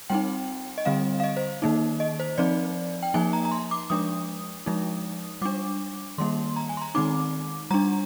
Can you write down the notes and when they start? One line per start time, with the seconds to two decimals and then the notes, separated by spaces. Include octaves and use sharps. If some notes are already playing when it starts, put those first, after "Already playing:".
0.10 G3 C4 D#4 G5
0.78 D#5
0.85 D3 G3 C4 F5
1.20 F5
1.24 D#5
1.37 C5
1.62 D#3 A#3 D#4
2.00 D#5
2.20 C5
2.38 F3 C4 D#4 D5
3.03 G5
3.14 F3 A#3 D#4 G#5
3.33 A#5
3.45 A#5
3.51 C6
3.71 D6
3.90 F3 G#3 D4 D#6
4.66 F3 G#3 D#4
5.42 G3 D4 D6
6.18 D#3 G3 A#3 C6
6.56 A#5
6.69 G#5
6.77 C6
6.82 A#5
6.95 D#3 G#3 C4 D#4 D6
7.71 G3 D4 A#5